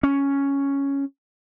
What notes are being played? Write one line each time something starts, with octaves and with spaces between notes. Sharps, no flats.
C#4